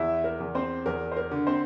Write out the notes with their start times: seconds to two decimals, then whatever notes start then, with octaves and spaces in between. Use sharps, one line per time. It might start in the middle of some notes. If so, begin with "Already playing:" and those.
Already playing: E2 E4 E5
0.24 A#4
0.40 E2
0.55 C4 C5
0.86 E2 A#4
1.12 C5
1.16 A#4
1.31 D3
1.47 C4 C5